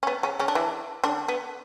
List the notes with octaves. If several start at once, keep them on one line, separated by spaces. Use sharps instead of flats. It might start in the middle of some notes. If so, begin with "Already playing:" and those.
C#4
B3
C#3 C#4
C#3 C#4
D4
E3 E4
D3 D4
B3